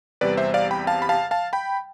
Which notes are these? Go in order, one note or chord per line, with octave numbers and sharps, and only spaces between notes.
E2 C3 G3 B4 D5
C5 E5
D5 F5
G5 B5
F5 A5
B5
F5 A5
F5 A5
G5 B5